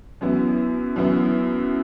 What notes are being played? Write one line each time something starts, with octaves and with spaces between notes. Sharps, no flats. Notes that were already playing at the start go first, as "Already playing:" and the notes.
F#2 E3 B3 E4
F#2 E3 B3 E4